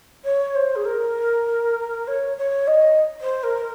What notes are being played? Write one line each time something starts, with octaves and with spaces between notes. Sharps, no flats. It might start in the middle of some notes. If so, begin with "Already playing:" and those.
C#5
C5
G#4
A#4
C#5
C#5
D#5
C5
A#4